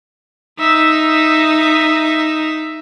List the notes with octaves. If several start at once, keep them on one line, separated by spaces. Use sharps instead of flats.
D#4 E5